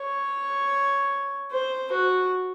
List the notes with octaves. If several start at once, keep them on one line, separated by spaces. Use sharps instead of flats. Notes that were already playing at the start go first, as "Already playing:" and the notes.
Already playing: C#5
C5
F#4